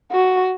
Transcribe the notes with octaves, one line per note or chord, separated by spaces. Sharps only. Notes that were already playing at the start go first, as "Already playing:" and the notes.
F#4